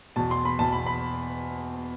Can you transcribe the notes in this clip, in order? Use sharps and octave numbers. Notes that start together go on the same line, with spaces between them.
E2 B2 A5
C6
B5
E2 B2 A5
B5
B5